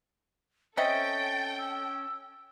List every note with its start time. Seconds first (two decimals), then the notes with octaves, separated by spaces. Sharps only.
0.77 C4 C#4 A4 D#5 E5 G5 A6
1.59 E6